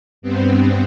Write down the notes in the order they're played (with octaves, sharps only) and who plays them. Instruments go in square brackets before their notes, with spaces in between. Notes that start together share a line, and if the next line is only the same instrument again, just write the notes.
[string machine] G2 B3 C4